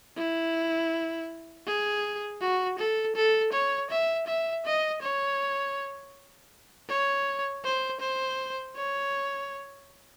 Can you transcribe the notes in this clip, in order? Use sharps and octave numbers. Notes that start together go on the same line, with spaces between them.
E4
G#4
F#4
A4
A4
C#5
E5
E5
D#5
C#5
C#5
C5
C5
C#5